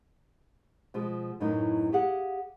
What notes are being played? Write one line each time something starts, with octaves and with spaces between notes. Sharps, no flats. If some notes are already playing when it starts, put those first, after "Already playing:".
B2 F3 G#3
F#2 A2 E3 F#3 D#4
G4 G#4 F5 F#5